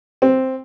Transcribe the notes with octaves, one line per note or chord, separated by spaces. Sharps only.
C4